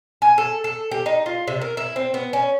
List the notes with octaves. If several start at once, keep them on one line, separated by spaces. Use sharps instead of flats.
G#5
A4
A4
G4
D#4
F4
C3
A#4
E4
C4
B3
C#4